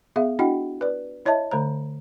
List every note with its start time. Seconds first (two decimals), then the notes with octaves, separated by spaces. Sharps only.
0.16 B3 G#4 E5 F5
0.39 D4 E4 F#4 D#5 F#5 G5
0.81 B4 D5
1.26 E4 C#5 D#5 E5 A5
1.51 D3 A3 C5 A#5